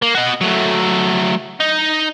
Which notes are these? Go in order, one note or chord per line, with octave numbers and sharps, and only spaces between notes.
A#3
F#4 D#5
F#3 A3
D#4